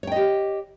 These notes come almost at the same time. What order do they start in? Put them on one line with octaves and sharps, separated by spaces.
C#5 G5 D#5 G4